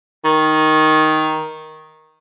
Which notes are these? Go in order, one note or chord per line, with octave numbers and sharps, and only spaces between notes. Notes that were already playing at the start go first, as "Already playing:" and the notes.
D#3